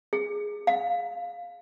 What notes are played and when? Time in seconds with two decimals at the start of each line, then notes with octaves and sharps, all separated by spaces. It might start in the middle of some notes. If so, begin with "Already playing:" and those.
0.13 G#4
0.67 F5